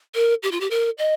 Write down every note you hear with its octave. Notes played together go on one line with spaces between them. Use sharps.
A#4
G4
F4
G4
A#4
D#5